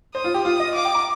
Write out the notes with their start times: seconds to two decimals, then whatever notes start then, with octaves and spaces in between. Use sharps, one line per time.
0.15 C5 D#6
0.24 F4
0.34 G4
0.45 F4 D#6
0.60 D#5
0.75 F5 D6
0.85 G5
0.95 A#5